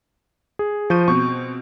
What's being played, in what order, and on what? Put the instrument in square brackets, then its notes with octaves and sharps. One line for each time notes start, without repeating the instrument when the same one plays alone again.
[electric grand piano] G#4
[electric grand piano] F3 [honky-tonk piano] C#6 G6 D#7
[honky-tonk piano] B2 C4 [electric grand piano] C#6